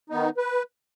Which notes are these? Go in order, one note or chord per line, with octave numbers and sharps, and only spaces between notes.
D#3 B3 D#4
B4